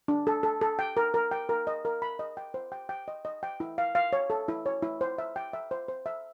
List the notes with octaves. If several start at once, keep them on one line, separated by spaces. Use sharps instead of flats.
D4
A4
A4
A4
G5
A#4
A#4
G5
A#4
D#5
A#4
B5
D#5
G5
C5
G5
G5
D#5
D#5
G5
E4
F5
F5
C#5
A4
E4
C#5
E4
C5
E5
G5
E5
C5
C5
E5